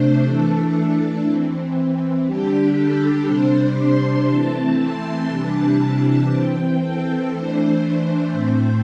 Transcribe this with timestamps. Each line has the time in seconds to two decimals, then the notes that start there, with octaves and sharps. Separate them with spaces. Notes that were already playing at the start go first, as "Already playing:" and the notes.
Already playing: C3 A3 D4 C5
0.24 E3 A3 D4 A4
1.25 E3 C4
2.26 D3 G3 D4 G4
2.76 A4
3.26 C3 G3 D4 C5
3.78 C6
4.27 E3 A3 C4 A5
4.79 C6
5.29 C3 E3 G3 D4 A5
5.79 A5
6.30 E3 C4 G5
6.80 A4
7.31 E3 A3 D4 C5
7.81 C5
8.32 A2 A3 C4